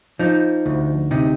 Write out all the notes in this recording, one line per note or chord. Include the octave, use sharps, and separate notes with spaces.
F3 D#4
D2
C3 D#4